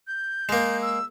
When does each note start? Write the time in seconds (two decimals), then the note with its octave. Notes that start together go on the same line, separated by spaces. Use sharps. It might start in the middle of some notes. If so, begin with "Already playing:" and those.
0.07 G6
0.49 G#3 A#3
0.82 E6